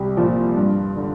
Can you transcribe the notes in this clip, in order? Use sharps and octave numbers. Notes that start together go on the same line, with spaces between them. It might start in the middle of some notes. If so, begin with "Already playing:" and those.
Already playing: C2 G4
A#2 F3 F4
G2
D3